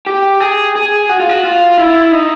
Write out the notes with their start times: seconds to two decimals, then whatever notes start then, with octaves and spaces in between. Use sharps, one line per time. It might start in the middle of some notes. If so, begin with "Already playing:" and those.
0.06 G4
0.40 G#4
0.75 G#4
1.09 F#4
1.20 F4
1.29 F#4
1.44 F4
1.78 E4
2.12 D#4